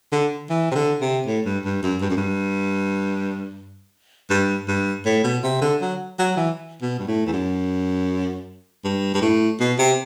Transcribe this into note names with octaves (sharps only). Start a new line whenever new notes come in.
D3
E3
C3
D3
C3
A2
G2
G2
F#2
G2
F#2
G2
G2
G2
A2
B2
C3
D3
F#3
F#3
E3
B2
G2
A2
E2
F#2
G2
G2
A2
B2
C3